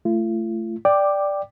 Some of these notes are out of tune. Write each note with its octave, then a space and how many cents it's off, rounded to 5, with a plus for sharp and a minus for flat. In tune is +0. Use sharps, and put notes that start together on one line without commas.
A3 +0 F4 -45
D5 +0 G5 +0 D6 +10